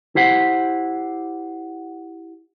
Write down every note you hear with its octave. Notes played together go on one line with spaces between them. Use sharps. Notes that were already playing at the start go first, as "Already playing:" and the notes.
E4 G4 C5 F#5